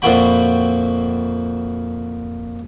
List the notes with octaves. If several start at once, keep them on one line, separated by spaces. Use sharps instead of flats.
F2 A#2 E4 F#4 G5 B5